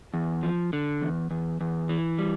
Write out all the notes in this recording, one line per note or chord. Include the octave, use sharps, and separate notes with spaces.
E2
F3
D3
E2
E2
E2
E3
G3